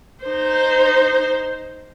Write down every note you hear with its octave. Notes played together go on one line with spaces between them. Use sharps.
D#4 C5